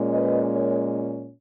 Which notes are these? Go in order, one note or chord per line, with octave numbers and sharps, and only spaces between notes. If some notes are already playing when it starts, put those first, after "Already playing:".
Already playing: A#2 G#3 C#4
B4 D#5
A#4 C#5